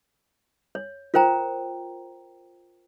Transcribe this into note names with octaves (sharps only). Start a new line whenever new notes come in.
C#5
F4 A#4 C5 G5 A#5